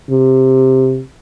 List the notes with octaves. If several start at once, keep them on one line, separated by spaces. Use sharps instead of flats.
C3